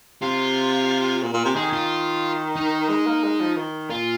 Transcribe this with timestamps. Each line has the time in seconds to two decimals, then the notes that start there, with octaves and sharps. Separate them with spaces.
0.22 C3 F4
1.23 A#2
1.34 A#2
1.45 C3
1.56 D#3 G#4
1.73 F4
2.56 D#4
2.89 G#3
3.07 A#3
3.24 G#3
3.40 F3
3.57 D#3
3.90 A#2 F4